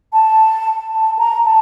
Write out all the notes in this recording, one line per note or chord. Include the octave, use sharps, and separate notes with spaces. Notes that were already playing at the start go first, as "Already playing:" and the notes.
A5
A5
A#5
A5